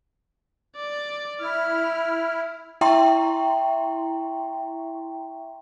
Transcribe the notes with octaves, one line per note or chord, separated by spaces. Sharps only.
D5
E4 F6
E4 E5 G5 A#5 C6 C#6